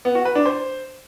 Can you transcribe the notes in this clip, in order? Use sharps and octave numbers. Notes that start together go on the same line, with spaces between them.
B3
F#4
B4
D4
C5